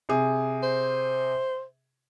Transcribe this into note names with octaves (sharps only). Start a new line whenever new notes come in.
C3 G#4
C5